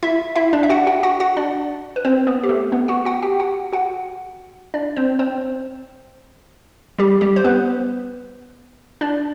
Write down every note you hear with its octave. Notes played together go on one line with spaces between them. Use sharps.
E4 E5
E4 E5
D4 D5
E5
F#4 F#5
F#4 F#5
F#4 F#5
F#4 F#5
D4 D5
B4
C4 C5
B3 B4
G4
A3 A4
B3 B4
F#4 F#5
F#4 F#5
G4 G5
F#4 F#5
F#4 F#5
D4 D5
C4 C5
C4 C5
G3 G4
G3 G4
C5
B3 B4
D4 D5